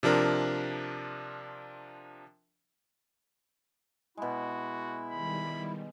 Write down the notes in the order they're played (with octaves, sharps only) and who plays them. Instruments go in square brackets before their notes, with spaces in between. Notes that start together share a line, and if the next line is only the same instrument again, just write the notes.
[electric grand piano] C3 F3 D4 A#4
[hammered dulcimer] B2 G#3 [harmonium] E4 [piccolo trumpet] F#4
[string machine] D#3 G3 [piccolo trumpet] B5